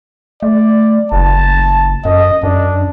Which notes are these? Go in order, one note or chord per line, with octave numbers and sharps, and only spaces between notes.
A3 D5
F#1 A5
F#2 D#5
F#2 D4